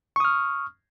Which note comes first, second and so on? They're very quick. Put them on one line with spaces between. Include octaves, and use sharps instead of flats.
C#6 D#6 F6